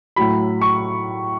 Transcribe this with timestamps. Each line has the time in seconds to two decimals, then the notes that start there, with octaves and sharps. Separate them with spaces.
0.16 A2 F#3 B5
0.61 C#6